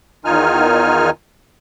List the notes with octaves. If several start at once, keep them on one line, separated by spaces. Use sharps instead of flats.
E2 D#3 D#4 F4 G#5 F6